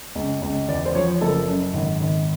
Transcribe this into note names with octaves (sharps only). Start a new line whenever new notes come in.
C#2
C#2
E2 D5
C5
F3 C#5
F#1 A4
F#2
G#1
G#1